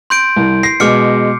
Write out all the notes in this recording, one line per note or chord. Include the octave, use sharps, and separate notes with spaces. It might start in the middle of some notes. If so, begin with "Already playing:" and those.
C6 G6 D7
C2
A#6 C7
B2 G#3 D6 F6 C#7